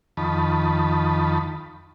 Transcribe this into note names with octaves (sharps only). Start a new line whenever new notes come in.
F2 D#3 A5 B5